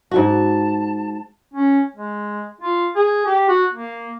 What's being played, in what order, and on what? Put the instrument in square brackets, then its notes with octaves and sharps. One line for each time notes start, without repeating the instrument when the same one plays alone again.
[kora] G#2 F#4 [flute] A5
[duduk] C#4
G#3
F4
G#4
G4
F#4
A#3